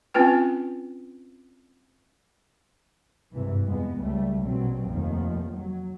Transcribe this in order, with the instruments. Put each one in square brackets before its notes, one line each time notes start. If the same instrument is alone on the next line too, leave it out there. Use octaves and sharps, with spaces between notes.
[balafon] C4 C#4 F4 B4 G5
[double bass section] G#1 G2 C3 E3
F2 G#3 B3
C#2 G3 A3
A#1 B2 F#3 G3 C4
F1 D#2 D#3 F3
F#3